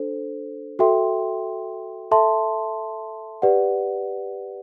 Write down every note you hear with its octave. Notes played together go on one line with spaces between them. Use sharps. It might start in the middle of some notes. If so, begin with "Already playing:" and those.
Already playing: D4 A4 C5
F#4 A4 E5 G5 C6
A4 E5 A5 C6
G4 B4 D5 F#5